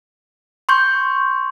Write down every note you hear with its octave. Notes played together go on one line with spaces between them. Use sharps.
C6 C#6 G6